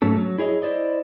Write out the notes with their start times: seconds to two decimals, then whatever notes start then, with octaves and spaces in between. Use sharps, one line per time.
0.02 G#2 F#3 A3 C#4 A4
0.17 F#3
0.38 E4 G#4 C#5 D#5
0.62 E4 C5 D5 D#5